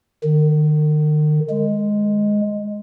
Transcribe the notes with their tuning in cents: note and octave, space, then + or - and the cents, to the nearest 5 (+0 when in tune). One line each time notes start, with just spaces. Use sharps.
D#3 -40
G#3 +0